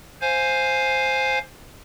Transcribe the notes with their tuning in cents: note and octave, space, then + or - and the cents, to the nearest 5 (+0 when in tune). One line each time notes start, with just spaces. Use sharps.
C5 +5 F5 +5 G#5 +0